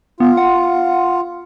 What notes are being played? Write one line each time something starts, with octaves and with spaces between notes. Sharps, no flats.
B3 F4
F#5